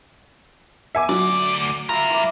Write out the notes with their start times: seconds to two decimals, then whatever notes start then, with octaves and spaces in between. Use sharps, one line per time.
0.95 E5 G#5 D6
1.09 D2 F#3 D5
1.89 G3 F4 E5 A#5 B5
2.10 E3 D5 D6